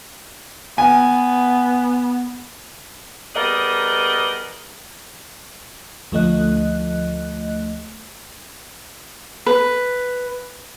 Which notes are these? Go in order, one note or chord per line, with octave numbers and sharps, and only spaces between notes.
B3 G#5
G3 B3 G#4 A#4 D#5
D2 F3 A3 D#5 F#6
B4